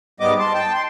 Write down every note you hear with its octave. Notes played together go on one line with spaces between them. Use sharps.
G#2 G3 B3 D#5 D6
A5 C6
G5 A5
C6